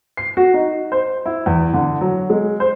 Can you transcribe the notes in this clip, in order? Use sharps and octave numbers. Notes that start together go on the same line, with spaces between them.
C7
F#4
D#4
C5
E4
E2
D3
F#3
G#3
C5